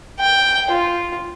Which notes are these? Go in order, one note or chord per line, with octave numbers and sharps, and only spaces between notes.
G5
F4